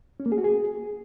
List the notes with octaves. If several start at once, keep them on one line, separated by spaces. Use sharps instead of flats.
C#4
A#3
G#4
F#4
G#4